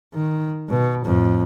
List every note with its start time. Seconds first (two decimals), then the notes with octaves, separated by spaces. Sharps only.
0.14 D#3
0.70 B2
1.05 F2 A2